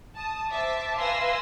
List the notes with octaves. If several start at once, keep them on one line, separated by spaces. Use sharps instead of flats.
A5 D#6
C5 E5 A5 D6
B4 F5 G#5 C6 E6 A#6